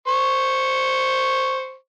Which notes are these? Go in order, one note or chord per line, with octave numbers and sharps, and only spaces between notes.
C5 C#6